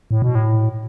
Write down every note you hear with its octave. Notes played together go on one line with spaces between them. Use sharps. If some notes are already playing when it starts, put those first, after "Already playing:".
A2
B2
A2